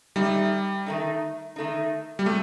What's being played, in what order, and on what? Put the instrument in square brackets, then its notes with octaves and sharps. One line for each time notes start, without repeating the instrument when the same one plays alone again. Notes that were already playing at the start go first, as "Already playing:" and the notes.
[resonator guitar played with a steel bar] D#3 A3 D#4 [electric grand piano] G3
[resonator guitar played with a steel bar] D#3 A3 D#4
D#3 A3 D#4
[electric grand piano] G3
[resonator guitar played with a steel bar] C3 F#3 [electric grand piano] A3